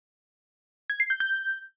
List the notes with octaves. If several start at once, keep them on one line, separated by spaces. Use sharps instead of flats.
G#6
C7
G6
G6